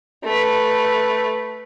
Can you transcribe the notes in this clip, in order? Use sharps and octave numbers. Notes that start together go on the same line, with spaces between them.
A3 B4